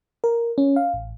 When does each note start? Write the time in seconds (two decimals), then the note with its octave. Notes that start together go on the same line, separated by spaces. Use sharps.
0.24 A#4
0.58 C#4
0.76 F5
0.94 A1